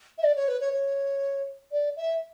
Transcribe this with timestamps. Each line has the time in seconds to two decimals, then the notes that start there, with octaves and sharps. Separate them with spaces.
0.18 E5
0.24 D5
0.36 C#5
0.48 B4
0.61 C#5
0.73 C#5
1.72 D5
1.97 E5